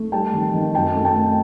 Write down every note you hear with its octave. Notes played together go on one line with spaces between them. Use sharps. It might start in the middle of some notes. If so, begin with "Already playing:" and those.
Already playing: A3
G3 G5 A5
D#3
D#3
F#2 G5 A5
A3
G5 A5
A3